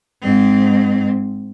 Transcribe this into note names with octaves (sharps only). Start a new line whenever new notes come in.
G#2 C4